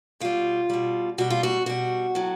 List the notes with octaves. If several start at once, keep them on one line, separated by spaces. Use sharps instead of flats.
B2 G3 F4
B2 G3
B2 G3 F#4
F4
F#4
B2 G3 F#4
A2 F#3